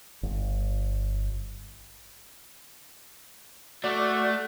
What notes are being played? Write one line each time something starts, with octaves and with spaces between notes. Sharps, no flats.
G1
A3 F#4 D5